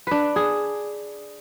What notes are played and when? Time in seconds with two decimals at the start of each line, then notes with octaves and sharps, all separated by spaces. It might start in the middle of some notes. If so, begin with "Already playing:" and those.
0.07 D4 B4
0.36 G#4